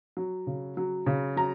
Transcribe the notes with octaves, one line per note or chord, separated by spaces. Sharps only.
F#3
C#3
F#3
C#3
F#3 A#5